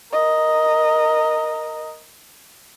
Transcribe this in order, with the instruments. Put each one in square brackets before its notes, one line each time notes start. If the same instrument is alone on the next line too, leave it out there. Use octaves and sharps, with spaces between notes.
[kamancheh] A#4 D#5